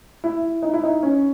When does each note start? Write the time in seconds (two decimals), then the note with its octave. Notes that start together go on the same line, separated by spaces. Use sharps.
0.24 E4
0.62 D#4
0.73 E4
0.83 D#4
1.03 C#4